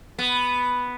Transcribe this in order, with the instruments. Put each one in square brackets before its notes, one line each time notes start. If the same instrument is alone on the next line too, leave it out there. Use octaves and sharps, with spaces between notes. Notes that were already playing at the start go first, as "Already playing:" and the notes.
[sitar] B3